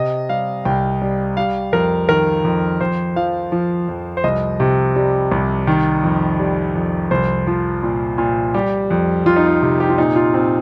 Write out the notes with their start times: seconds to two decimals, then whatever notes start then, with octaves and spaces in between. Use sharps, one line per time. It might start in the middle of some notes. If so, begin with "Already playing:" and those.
Already playing: C3 D#5
0.29 G3 F5
0.65 C2 G5
1.02 G3
1.37 G3 F5
1.73 F2 A#4
2.09 D#3 A#4
2.45 F2
2.81 F2 C5
3.16 F3 F5
3.52 F3
3.89 F2
4.17 C5
4.24 C2 D#5
4.60 C3
4.96 G3
5.32 C2
5.67 D#3
6.03 F2
6.39 G3
6.75 F2
7.11 C2 C5
7.47 F3
7.83 A#2
8.18 A#2
8.54 G3 G4
8.90 F2
9.26 F2 F4
9.36 D#4
9.47 F4
9.62 C3
9.80 G4
9.89 F4
9.98 A#2 D#4
10.16 F4
10.34 A#2 C4